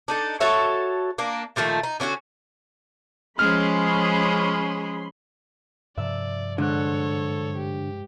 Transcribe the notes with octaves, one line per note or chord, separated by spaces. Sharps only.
D4 D#4 A4
F#4 A4 C#5 E5
A#3 D4
A#2 D#3 F3 A3
D#4
D3 C#4 E4 F#4
F3 G#3 C#4 G#4 B5 C6 F6
G2 C3 F3 D5 E5
G#2 D3 A4 C#5 F#6
G4